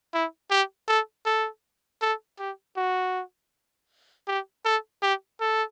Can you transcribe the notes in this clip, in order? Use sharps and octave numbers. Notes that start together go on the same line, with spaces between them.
E4
G4
A4
A4
A4
G4
F#4
G4
A4
G4
A4